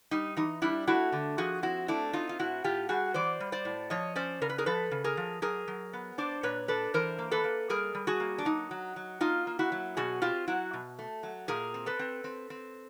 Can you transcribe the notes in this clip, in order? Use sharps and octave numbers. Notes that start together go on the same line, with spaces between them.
G3 D#4
E3 D#4
G3 D4 E4
A3 E4 F#4
D3
F3 F#4 G#4
C4 E4 F#4
A3 D4 E4
C4 D#4 F4
F4
A2 E4 F#4
A2 F4 G4
G3 F#4 G#4
E3 C5 D5
G3
C5 D5
A2
F3 C#5 D#5
C#4 C5 D5
C#3 A#4
B4
G#4 A#4
F3 A4 B4
C#3
G#4 A#4
F3
F#3 G#4 A#4
F#3
B3
D4 C5 D5
A#2 B4 C#5
D4 A4 B4
E3 A#4 C5
A#3
A4 B4
A#3
G3 G#4 A#4
G3
F#4 G#4
A#3
D4
F#3 D#4
F#3
F#3
A#3 D#4 F4
A#3
E4 F#4
F#3
B2 F#4 G#4
C4 F4 G4
F#3 E4 F#4
B2
A3
F#3
A#2 G#4 A#4
C4
A4 B4
C4
C4
C4